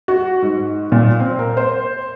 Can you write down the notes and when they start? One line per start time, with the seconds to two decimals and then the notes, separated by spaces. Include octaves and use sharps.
0.08 F#4
0.42 G#2
0.92 A#2
1.19 C4
1.39 A#4
1.57 C5